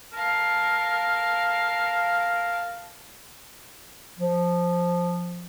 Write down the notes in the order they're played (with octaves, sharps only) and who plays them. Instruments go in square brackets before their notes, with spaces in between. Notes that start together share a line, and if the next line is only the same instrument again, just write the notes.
[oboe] A#4 [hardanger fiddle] F5 A5
[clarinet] F3